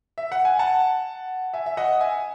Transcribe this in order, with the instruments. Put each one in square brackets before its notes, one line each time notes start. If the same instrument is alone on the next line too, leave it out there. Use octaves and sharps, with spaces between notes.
[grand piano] E5
F#5
G#5
F#5 A5
E5 G#5
E5
D#5 F#5
E5 G#5